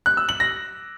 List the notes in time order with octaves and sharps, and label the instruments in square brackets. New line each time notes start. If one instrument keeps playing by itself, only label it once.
[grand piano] F#6
E6
F#7
A#6